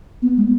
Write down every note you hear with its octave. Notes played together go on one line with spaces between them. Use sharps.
B3
G#3